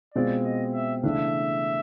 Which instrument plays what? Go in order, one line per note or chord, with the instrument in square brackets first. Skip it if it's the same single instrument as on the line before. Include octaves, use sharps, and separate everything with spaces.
[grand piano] B2 G#3 C4 F4 [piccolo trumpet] D5
[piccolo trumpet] D#5
E5
[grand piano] C#3 E3 A3 D4 [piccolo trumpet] E5